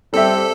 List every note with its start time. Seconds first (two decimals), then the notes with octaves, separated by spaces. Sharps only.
0.13 G3 C4 G4 A4 E5